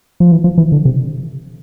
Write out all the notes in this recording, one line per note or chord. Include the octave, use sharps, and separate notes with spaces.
F3
E3
F3
E3
D3
C3